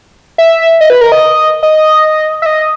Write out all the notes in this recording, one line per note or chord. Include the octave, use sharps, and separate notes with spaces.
E5
D#5
B4
A#4
D#5
D#5
E5
D#5